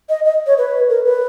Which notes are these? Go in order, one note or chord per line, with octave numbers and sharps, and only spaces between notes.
D#5
D#5
C#5
B4
A#4
B4